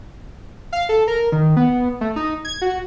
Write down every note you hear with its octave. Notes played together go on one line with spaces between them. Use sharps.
F5
A4
A#4
D#3
B3
A3
D#4
G#6
F#4